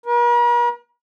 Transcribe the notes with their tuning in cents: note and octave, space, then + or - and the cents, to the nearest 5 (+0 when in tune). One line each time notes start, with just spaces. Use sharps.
A#4 +45